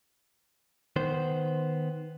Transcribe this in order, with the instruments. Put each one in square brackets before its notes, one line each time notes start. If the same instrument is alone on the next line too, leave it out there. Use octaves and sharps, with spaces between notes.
[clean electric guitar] D#3 B3 C5